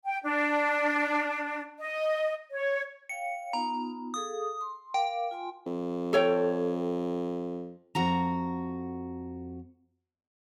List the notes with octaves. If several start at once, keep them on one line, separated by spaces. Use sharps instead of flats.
G5
D4
D#5
C#5
C#5 F5 G5 C#7
B3 D#4 F4 A#5
G#4 A4 F5 D#6
C6
A#4 F5 G5 D6
F4 G#5 C6
F2
A4 C#5 G5
F2 F#4 A#5